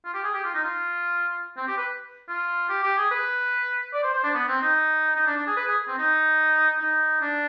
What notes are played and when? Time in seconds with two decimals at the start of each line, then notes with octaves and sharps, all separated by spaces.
0.05 F4
0.14 G4
0.24 G#4
0.34 G4
0.44 F4
0.54 D#4
0.65 F4
1.57 C4
1.68 G4
1.77 B4
2.29 F4
2.69 G4
2.83 G4
2.98 G#4
3.11 B4
3.93 D5
4.03 C5
4.14 C5
4.24 D4
4.34 B3
4.48 C4
4.61 D#4
5.16 D#4
5.27 D4
5.37 D4
5.47 G#4
5.57 B4
5.67 G#4
5.88 C4
5.99 D#4
6.80 D#4
7.21 D4